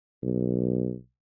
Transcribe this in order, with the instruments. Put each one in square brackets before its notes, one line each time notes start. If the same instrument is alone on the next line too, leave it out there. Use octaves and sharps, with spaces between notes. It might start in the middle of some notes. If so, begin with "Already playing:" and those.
[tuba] B1